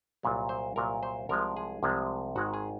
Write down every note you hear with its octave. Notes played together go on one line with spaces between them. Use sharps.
C2 A#2 F#3
C5
C2 A#2 F#3 A#4
C5
C2 C3 F3 G#3 A#4
G#4
C2 C3 F3 G#3
G#1 G#2 D#3 G#3 F#4
G#4